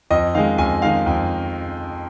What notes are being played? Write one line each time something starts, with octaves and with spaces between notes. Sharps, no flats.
F2 D#5
D#3 G#3 F5
F2 G#5
D#3 G#3 F5
F2